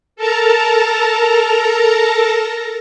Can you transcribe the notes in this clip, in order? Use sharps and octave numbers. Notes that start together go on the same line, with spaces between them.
A4 A#4 A5 A#5